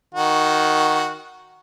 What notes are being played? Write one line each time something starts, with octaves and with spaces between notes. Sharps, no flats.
D#3 F#4